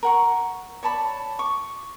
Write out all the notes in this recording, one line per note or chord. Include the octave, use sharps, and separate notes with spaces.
A#4 F#5 C#6
C#5 D5 A5 B5
C#6 D6